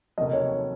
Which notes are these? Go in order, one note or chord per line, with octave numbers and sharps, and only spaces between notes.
F1 D#2 D#3 F#3 D#5
C#5